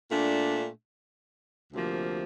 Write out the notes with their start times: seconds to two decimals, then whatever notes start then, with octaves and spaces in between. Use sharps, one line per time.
0.11 A#2 A3 D4
1.73 D2 C3 F3 A#3